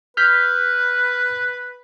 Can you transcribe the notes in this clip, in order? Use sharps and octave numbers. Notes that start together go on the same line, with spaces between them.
B4 F6 G6 B6